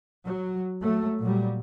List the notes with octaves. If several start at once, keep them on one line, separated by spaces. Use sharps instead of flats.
F#3
F#3 A3
A#2 F#3 G3